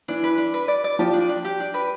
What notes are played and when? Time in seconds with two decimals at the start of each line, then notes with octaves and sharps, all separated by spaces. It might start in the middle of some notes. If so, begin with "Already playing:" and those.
0.08 E3 D4
0.24 B4
0.38 D4
0.54 B4
0.68 D5
0.84 D5
0.99 F3 G4
1.13 D4
1.29 D4
1.45 G4
1.60 D4
1.74 B4